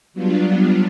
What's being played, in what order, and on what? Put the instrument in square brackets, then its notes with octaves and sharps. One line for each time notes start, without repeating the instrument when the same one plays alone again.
[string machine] F#3 G3 B3 D4 F4